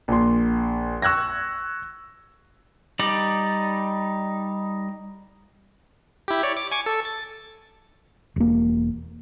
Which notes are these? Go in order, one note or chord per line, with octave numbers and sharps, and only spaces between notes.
A#1 C6
C#6 E6 F#6 G#6 A#6
G3 D#4 D5
E4 G4
C#5 D5
D6
G#5 C#6 D6
A4
A6
E1 A#3